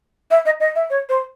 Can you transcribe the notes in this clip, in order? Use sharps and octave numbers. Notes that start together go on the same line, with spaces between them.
E5
D#5
D#5
E5
C#5
C5